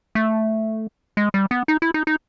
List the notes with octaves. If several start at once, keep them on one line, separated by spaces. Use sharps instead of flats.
A3
G#3
G3
B3
D#4
E4
D#4
D#4